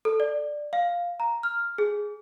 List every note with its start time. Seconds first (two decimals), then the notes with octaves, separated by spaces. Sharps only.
0.05 A4
0.20 D5
0.73 F5
1.20 A#5
1.43 F6
1.78 G#4